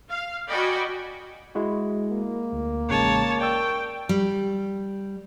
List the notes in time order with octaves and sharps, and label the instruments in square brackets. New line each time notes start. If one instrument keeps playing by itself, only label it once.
[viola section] F5
F#4 D5 D#5 G5 G#5 B5
[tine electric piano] G#3 E4 F#4
[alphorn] A#3
[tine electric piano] D2
[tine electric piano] A1 C#3 G#3 [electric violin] C#5 A5
[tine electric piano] D5 C#6 E6 [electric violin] G5
[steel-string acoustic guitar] G3